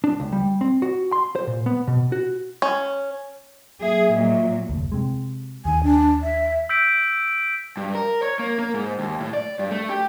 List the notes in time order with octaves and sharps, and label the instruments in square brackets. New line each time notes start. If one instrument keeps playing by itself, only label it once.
[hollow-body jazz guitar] D4
C#2
G3
C4
F#4
C6
C5
A#2
B3
B2
F#4
[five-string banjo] C#4
[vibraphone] F#3 A#3 E5 [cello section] G#4
[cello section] A#2 F#3 [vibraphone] D#5 E5
[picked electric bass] F1 D2
C3 G#3
[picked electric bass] D#2 D#3 [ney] G#5
[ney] D4
E5
[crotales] E6 G6 B6 D7
[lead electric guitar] G2
A#4
C#5
A#3
A#3
G#2
D#2
A2
D5
G2
A3
G4